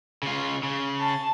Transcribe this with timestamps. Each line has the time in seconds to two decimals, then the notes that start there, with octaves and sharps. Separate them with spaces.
0.23 C#3 F4
0.63 C#3
1.00 A5